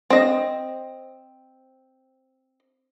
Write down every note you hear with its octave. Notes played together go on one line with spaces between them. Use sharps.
C4 D#5